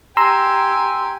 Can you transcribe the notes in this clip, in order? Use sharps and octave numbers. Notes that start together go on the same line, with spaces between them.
G4 G#5 A#5 C6 E6